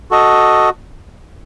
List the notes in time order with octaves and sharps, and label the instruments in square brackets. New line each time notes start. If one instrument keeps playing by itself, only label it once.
[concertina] F#4 A4 D#5